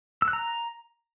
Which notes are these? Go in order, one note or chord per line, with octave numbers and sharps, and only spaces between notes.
E6
F#6
A#5